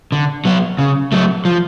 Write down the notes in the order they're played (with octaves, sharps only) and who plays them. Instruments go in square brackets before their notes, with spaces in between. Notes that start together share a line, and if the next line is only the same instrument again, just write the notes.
[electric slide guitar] D3
F#3 B3
C#3
F#3 A3
F3